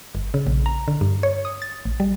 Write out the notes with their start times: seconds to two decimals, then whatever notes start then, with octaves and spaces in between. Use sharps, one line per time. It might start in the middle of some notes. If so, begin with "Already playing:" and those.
0.15 G1
0.34 C#3
0.47 A#1
0.66 A#5
0.88 D3
1.01 G2
1.23 C#5
1.45 D#6
1.62 A6
1.85 A1
2.00 G3